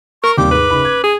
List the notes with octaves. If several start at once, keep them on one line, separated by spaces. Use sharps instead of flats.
A#4 C#6
D#2 C3 G3 G4 D6
G#2 B4
F#1 D#4 B5
G#6
G#4